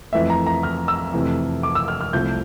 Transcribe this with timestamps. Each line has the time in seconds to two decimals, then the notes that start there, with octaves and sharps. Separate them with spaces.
0.13 F2 E3 A3 E5
0.30 A#5
0.47 A#5
0.63 F6
0.88 E6
1.13 F2 C3 E3 A3
1.63 D6
1.75 E6
1.88 F6
2.01 F6
2.13 C2 C3 F3 A3 G6